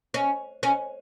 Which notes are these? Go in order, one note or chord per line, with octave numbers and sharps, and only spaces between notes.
C#4
C#4